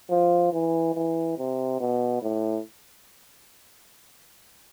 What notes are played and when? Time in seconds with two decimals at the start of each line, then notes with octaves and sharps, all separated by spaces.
0.10 F3
0.53 E3
0.94 E3
1.38 C3
1.80 B2
2.22 A2